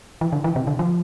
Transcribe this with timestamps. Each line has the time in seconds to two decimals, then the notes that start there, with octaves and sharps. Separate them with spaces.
0.21 E3
0.33 D3
0.44 E3
0.56 C3
0.67 D3
0.79 F3